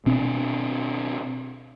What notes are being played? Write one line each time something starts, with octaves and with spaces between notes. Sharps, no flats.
B2 C4 D4